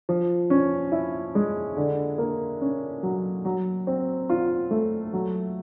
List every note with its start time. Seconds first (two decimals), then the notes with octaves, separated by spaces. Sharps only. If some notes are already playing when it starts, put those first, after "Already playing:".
0.09 F3
0.50 C#4
0.92 E4
1.35 G#3
1.77 D3
2.18 A#3
2.61 C#4
3.03 F#3
3.45 F#3
3.87 C4
4.30 F4
4.71 A3
5.13 F#3